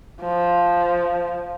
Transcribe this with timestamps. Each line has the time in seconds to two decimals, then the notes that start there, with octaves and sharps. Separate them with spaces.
0.22 F3